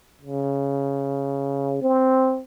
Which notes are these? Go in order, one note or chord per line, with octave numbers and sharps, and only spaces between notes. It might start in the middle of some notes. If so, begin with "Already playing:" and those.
C#3
C4